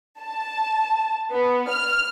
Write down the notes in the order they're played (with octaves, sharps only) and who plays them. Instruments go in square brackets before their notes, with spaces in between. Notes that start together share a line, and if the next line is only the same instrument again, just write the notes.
[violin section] A5
B3
F6